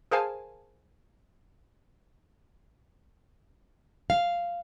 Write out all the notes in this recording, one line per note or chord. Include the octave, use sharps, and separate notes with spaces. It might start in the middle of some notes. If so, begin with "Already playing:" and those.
G#4 A#4 C5 F5 G#5 A5
F5